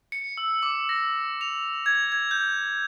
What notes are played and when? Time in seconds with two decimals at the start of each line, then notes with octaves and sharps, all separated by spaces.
0.12 C#7
0.38 E6
0.63 D6
0.89 A#6
1.41 F7
1.86 G#6
2.12 G#6
2.31 G6